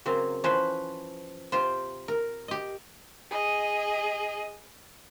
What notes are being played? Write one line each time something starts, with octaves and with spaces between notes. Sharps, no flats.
C#3 F#3 A#3 C4
E3 F3 C#4 B4 C5
C3 F4 G4 C5
A#4
G4 D#5
G#4 D#5